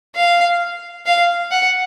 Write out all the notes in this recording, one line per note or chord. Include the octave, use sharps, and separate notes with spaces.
F5
F5
F#5